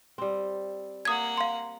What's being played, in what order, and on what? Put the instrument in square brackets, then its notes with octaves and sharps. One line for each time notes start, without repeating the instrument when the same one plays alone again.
[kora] G3 C4
[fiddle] A#3 F#5 [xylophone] D#6 G#6
[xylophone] F5 C6